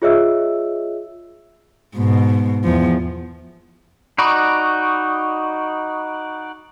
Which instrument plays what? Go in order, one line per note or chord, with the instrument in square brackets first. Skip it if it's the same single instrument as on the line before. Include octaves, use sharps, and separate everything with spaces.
[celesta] F4 G#4 C#5 D#5 E5 E6
[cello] G#2 B2
E2 F3
[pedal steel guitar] D#4 F#4 D5 [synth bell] B5 C#6 D#6